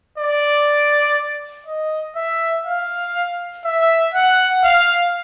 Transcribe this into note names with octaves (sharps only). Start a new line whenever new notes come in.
D5
D#5
E5
F5
E5
F#5
F5